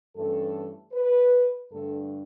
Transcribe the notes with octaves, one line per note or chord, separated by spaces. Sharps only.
G2 E3 A3 C#4 A4
B4
G2 D3 A3 D4 A4